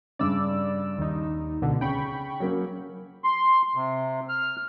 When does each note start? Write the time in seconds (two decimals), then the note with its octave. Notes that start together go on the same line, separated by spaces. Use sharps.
0.19 G2 C#3 D5 E6
0.98 D#2 D#4
1.62 C#2 B2 D3
1.81 C#3 G5 B5 C#6
2.40 F#3 A#3 C#4
3.24 C6
3.75 C3
4.29 F6